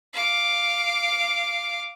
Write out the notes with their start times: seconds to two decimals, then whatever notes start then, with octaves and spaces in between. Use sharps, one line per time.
0.13 F5 D6